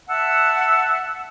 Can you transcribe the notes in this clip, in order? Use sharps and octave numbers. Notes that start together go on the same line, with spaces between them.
E5 F#5 A5 E6